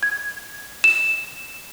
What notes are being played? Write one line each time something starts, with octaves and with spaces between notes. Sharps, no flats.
G#6
E7